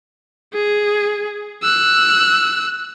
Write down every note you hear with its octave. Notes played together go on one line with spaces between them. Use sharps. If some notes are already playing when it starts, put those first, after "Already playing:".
G#4
E6 F#6